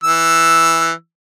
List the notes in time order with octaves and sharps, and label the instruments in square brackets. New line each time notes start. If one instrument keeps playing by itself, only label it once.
[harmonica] E3 E6